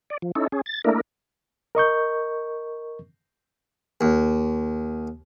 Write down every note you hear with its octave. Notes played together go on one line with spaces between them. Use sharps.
D5
F3
C#4 D#4 E4 A4
C#4 G#4
A6
A3 A#3 D4 E4 A#4
A#4 D#5 C#6 G6
D#2